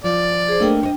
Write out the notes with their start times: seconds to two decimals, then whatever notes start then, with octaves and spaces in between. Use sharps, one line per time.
0.04 F3 D5
0.48 G#4 C5
0.60 A3 A#3 D4 D#5 G5
0.81 C5 C#5 D#5